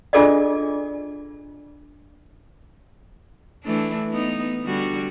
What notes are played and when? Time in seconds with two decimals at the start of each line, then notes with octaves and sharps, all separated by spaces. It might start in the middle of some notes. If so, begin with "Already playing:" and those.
0.13 D4 F4 G#4 A4 D5 D#5
3.64 E3 A3 D4
4.12 B3 D#4
4.64 D3 G3 F#4